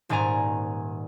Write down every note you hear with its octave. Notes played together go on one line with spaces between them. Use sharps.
D#1 G#2 D5 G#5 A#5